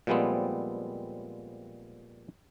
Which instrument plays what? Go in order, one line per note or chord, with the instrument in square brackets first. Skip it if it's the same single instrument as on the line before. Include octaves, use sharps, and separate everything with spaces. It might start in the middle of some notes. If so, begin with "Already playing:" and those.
[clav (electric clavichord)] A#2 F3 G3 G#3 B3 C4